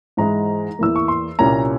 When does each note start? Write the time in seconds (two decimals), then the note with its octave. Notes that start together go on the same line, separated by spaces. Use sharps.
0.17 G#2 E3 G#3 E4 A#5
0.79 E2 E3 A#3 E6
0.96 C#6
1.08 C6
1.39 C2 A#2 G3 A#3 C#4 A#5